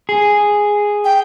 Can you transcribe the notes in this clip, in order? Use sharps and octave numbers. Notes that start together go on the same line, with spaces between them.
G#4
G5